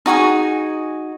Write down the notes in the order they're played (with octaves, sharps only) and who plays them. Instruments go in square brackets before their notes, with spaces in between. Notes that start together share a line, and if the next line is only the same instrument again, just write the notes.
[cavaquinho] D#4 F#4 G#4 G#5